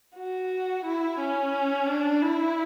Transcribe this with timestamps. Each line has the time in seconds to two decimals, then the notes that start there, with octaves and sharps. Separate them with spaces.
0.17 F#4
0.85 E4
1.19 C#4
1.88 D4
2.22 E4